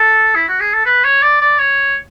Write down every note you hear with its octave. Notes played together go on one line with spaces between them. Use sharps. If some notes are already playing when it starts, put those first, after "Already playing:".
Already playing: A4
E4
F#4
G#4
A4
B4
C#5
D5
D5
C#5